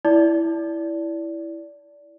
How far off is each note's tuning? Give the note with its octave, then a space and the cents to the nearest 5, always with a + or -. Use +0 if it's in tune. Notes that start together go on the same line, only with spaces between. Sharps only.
E4 +0 D5 -20